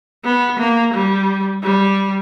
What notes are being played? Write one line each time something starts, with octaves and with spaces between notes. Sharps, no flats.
B3
A#3
G3
G3